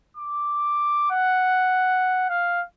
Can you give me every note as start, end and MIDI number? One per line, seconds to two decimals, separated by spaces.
0.17 1.10 86
1.11 2.27 78
2.29 2.61 77